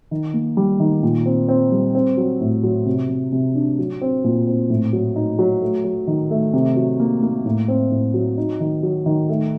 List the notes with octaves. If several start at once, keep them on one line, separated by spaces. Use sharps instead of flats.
D#3
A#3
G3
D#3
A#2
C4
C4
G3
C4
F#3
A2
F#3
C3
C3
C3
D4
F#3
C4
A#2
C4
A2
F#3
D#4
F#3
A3
F#3
D#3
A3
C3
F#3
A#3
A#3
A2
C4
A2
F#3
D#4
D#3
F#3
D#3
A3